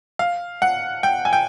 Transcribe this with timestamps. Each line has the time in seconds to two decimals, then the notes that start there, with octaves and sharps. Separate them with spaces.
0.19 F5
0.62 F#5
1.03 G5
1.25 G#5
1.33 G5